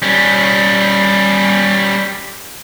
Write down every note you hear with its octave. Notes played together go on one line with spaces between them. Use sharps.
G3 C#4